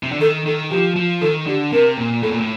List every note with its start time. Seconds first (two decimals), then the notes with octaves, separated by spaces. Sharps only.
0.03 C3
0.11 D3
0.20 D#3 A4
0.46 D#3 A4
0.70 F3 G4
0.96 F3
1.21 D#3 A4
1.46 D3 G4
1.72 C3 A#4
1.97 A#2
2.23 A2 A4
2.31 A#2
2.40 A2